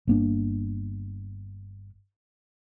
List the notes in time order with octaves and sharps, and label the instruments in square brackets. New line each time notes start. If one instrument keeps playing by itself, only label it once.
[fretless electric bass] G1 A#3 D4